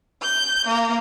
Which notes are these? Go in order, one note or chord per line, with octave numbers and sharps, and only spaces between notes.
G6
A#3